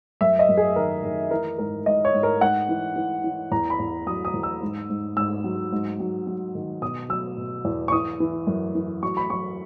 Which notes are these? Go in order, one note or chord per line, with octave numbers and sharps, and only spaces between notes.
F#2 E5
D#5
F#2
G#4
D#3 A#4
D#3
E3 A#4
G#2 A#4
G#2 D#5
C#5
G#2
A#4
G#2 F#5
E3
E3
E3
E2 A#5
B5
E2
F#3 D#6
D#6
E2
E6
G#2
G#2
G#2 E6
F#3
G#2
F#3
F#3
D#3
B2 D#6
F#3 E6
B2
E2
C#6
E3 D#6
E3
F#2
E3
F#3 C#6
B5
F#3 C#6